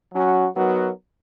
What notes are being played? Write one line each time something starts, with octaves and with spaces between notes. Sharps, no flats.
F#3 C#4 F#4
F#3 B3 D#4 F#4 A#4